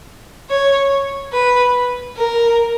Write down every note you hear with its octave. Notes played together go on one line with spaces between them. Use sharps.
C#5
B4
A#4